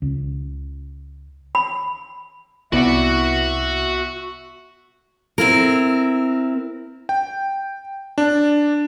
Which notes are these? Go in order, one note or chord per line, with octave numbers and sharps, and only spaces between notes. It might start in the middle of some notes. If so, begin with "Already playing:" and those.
C#2
B5
C2 B3 E4 F#4 D5 E5 F#5
C4 E4 A#4
G5
D4